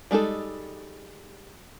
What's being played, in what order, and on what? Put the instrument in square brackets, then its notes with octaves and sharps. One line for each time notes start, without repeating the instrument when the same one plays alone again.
[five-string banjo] G3 G#3 D#4 A4